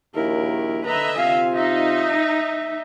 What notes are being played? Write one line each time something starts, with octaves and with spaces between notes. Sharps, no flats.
A#1 D#2 E4 A#4
D3 B4 D#5 E5 A#5
C3 F4 F5 G#5
D#4 E5